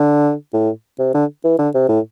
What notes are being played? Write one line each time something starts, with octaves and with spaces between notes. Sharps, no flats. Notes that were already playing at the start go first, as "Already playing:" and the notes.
Already playing: D3
A2
C3
D3
E3
D3
C3
A2